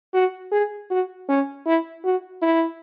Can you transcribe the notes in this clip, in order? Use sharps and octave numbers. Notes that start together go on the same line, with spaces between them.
F#4
G#4
F#4
C#4
E4
F#4
E4